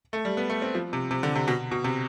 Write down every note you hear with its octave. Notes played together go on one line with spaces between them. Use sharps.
A3
G3
B3
A3
C4
F3
C3
C3
D3
C3
B2
B2
C3